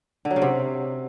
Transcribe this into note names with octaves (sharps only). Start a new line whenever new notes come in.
D3
F#3
C#3
C3